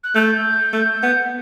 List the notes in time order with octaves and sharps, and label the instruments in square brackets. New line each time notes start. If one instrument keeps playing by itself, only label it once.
[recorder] F#6
[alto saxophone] A3 [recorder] G6
[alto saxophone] A3
B3